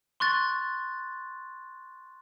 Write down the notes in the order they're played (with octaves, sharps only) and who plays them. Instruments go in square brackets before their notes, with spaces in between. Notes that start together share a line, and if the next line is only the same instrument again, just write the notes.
[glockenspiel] C6 C#6 F#6 A6